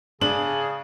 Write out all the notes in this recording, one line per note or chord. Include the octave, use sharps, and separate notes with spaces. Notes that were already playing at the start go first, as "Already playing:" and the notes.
C#3 D4 G#4 F#7